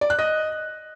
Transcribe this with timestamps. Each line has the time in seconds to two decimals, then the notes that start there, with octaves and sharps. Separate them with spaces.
0.01 D5
0.10 F#6
0.19 D#5